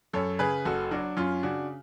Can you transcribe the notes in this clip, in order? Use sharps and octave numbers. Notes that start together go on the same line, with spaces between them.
F#2 A4 C#5
C#3 G#4 B4
F#1 F#4 A4
F#3 D4 F#4
F#2 C#4 F4
C#3 D4 F#4